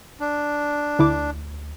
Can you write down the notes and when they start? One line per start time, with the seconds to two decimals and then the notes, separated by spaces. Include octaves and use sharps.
0.20 D4
0.99 D2 D3 E4 D6